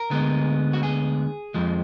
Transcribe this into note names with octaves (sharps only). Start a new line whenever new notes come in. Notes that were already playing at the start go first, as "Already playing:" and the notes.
Already playing: A#4
D2 D3 G#3 B3
F#4
G#4
F2 F3 G#3